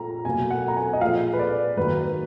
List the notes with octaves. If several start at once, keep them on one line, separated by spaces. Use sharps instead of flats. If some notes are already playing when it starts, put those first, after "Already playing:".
Already playing: A#2 G#3 A#5
B2 F#3 A#3 G#5
F#5
A#5
G#5
D#5
A#2 F3 G#3 F5
B4
D5
G#2 D#3 F#3 A#3 B4